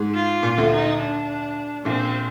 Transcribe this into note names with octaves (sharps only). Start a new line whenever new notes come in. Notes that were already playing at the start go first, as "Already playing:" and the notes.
Already playing: G#2 G#3
F4
A#2 A#3
D2 D3
D#4
D4
A#1 A#2 C4